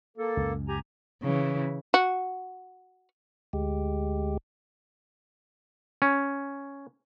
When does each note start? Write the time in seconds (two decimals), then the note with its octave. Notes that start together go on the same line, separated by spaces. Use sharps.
0.18 A#3 A4
0.37 C#2 F#2
0.68 G4 G#5 A#5
1.22 C#3 E3
1.94 F#4
3.53 D2 G#3 G4
6.02 C#4